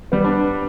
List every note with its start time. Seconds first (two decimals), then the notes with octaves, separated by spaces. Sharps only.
0.12 G3 B3
0.24 B3 D4